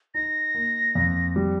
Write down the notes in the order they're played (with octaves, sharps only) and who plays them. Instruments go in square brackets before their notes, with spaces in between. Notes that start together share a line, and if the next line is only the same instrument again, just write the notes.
[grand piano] D#4 [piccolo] A#6
[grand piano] A#3
F2
G3